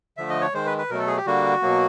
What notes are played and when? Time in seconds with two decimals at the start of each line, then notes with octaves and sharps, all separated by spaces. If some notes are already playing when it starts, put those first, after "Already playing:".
0.17 D3 F3 A3 E5
0.29 D#5
0.41 C#5
0.53 D#3 G#3 C5
0.66 B4
0.78 B4
0.90 B2 F#3 A3 A#4
0.99 A4
1.07 G#4
1.17 G4
1.26 D3 G3 A#3 F#4
1.62 B2 F#3 A#3